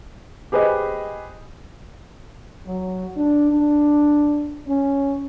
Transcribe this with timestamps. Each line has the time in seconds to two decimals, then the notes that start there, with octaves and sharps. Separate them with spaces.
0.52 G4 G#4 B4 C5 D#5
2.66 F#3
3.16 D4
3.51 D4
4.68 C#4